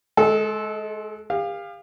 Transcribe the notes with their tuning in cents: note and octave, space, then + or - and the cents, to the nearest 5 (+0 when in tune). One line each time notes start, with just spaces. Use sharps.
G#3 +25 F#4 +0 A4 -15
G4 +45 F5 +0